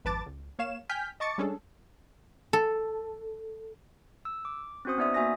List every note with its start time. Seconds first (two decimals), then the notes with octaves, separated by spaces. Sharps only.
0.05 G#1 F2 B4 A5 D6 A6
0.26 C#2
0.59 A#3 C#5 F5 E7
0.89 G5 G#5 F6 G6 B6
1.20 D#5 A5 C#6 D6 A6 C#7
1.38 G3 G#3 C#4 D4 G#4 A4
2.53 A4
4.25 E6
4.45 D6
4.85 C4 C#4 F#4 C5 D#6
4.98 B3 D#4 D5 E5 D#6
5.14 A#3 F#4 E5 G#5 D#6 A#6